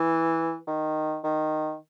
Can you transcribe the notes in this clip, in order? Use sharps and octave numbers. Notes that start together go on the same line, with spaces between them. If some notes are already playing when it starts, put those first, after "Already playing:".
Already playing: E3
D#3
D#3